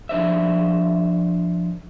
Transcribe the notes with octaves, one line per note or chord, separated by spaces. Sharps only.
F3 D4 C5 E5